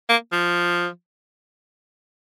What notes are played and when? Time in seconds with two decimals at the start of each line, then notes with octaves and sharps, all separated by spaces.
0.09 A#3
0.32 F3